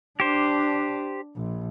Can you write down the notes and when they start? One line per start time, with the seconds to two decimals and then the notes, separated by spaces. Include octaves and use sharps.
0.20 D4 G4 C5
1.36 A#1